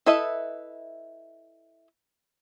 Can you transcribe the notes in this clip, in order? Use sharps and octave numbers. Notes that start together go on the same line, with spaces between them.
E4 A4 B4 D#5 E5